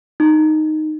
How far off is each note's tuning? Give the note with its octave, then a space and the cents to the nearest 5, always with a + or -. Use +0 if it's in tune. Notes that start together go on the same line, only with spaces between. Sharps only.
D#4 -5